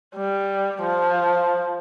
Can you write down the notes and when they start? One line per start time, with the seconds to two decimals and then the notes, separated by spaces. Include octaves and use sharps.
0.16 G3
0.82 F3